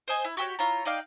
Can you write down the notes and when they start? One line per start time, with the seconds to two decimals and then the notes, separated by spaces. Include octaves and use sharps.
0.08 C5 D#5 G#5
0.24 E4
0.37 F#4 G4 A4 C#5
0.59 E4 F4 C#5 A#5
0.85 D#4 D5 F5 G5